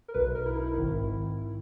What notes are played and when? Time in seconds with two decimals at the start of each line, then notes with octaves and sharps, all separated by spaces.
0.08 A#4
0.14 B1 B2 B4
0.35 A#4
0.46 E4
0.56 D#4
0.66 E4
0.76 G#1 G#2 D#3